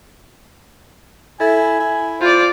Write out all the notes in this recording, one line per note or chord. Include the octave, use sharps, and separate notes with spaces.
E4 A4 E5 G#5
E4
F4 C5 D5